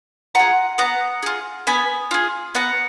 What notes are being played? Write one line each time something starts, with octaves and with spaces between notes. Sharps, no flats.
F4 G#4 F#5 A#5
B3 F#5 A#5
F4 G#4
B3 G#5 B5
F4 G#4
B3 F#5 A#5